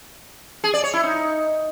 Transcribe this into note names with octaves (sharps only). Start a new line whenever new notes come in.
G#4
D5
C#5
E4
D#4